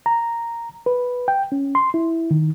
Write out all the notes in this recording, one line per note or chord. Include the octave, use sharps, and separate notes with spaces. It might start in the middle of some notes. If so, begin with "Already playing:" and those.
A#5
B4
G5
C#4
C6
E4
D#3